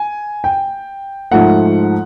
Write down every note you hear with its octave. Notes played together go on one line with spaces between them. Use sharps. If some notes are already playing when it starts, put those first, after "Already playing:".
Already playing: G#5
G5
G#2 F3 A3 F#5